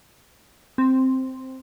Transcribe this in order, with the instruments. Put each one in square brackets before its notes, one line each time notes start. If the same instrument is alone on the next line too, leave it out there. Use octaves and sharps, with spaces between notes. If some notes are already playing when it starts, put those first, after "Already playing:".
[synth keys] C4